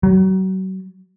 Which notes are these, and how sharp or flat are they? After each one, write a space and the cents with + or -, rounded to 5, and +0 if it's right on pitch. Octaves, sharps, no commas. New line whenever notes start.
F#3 +35